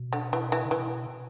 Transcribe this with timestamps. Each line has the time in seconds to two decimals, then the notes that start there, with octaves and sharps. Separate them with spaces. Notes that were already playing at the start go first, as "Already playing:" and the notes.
Already playing: B2
0.13 D3
0.33 E3
0.52 E3
0.65 C#3
0.71 B2 E3